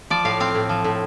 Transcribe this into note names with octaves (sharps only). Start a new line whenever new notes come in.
F3 D5
A2 F5
C4 F5
A2
F3
A2